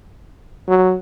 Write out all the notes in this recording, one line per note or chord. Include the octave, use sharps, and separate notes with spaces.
F#3